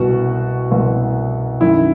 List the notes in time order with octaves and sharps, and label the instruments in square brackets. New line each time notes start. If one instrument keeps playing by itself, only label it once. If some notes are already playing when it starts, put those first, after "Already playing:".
Already playing: [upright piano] C2 B2 F#4
C2 B2
F#2 D#3 E4